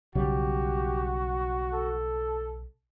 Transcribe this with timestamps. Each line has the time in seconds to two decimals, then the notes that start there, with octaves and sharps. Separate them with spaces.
0.15 B1 C#3 G3 F#4 G4
1.72 A4